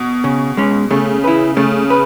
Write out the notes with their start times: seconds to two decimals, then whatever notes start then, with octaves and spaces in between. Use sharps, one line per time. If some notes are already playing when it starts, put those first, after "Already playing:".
Already playing: B2
0.24 C#3
0.57 G#3 C#4
0.91 C#3 A3
1.24 E4 B4
1.57 C#3 A3
1.90 B4